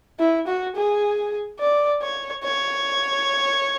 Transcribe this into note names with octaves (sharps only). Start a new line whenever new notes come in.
E4
F#4
G#4
D5
C#5
C#5